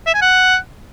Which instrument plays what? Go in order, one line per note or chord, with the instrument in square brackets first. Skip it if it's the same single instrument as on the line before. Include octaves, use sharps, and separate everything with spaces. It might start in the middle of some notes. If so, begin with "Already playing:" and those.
[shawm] E5
G#5
F#5